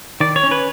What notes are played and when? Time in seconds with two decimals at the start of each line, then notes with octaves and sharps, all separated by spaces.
0.20 D#3 D5
0.36 C#5
0.43 C#4
0.51 B4